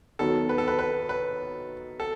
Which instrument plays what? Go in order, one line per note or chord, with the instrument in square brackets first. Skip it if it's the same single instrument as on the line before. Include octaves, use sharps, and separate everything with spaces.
[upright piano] D#3 F#3 B3 [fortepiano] A4
[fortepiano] B4
A4
B4
B4
B4
A4